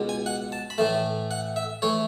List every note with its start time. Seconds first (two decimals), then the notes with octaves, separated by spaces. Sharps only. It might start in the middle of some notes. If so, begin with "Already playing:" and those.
Already playing: C#2 B2 G#3
0.09 G#5
0.26 F#5
0.52 A5
0.70 B5
0.78 A2 E3 A3 A5
1.31 F#5
1.56 E5
1.82 E3 A3 C#5